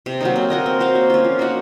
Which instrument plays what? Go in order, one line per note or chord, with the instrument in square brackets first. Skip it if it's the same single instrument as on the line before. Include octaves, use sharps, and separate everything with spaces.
[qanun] C3
F#3 A#3 D#4
C4
F#4 A#4 D#5
C4
F#4 C5 F5
A#3
C#4 F4
F3
A#3 D#4 F#4